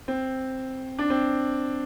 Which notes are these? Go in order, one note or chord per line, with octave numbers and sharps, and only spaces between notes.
C4
D4
C4